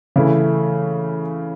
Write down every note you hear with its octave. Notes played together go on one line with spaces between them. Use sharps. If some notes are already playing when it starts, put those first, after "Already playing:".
C#3 E3 A3 E4